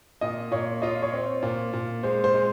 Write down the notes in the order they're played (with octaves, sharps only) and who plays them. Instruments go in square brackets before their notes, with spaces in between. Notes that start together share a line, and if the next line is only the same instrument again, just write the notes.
[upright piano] A#2 [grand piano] D#5
[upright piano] A#2 [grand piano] C#5
[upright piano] F4 [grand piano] D#5
[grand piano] C#5
[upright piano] C4
A#2
A#2
[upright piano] G#3 [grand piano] C5
[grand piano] C5
[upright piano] G#3